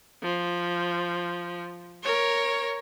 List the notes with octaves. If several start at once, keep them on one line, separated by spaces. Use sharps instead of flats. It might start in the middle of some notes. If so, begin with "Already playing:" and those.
F3
A#4 C#5